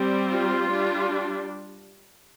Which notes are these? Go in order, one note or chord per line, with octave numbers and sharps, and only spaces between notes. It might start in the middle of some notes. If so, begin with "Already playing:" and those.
Already playing: G3 C4
F4
G3 D4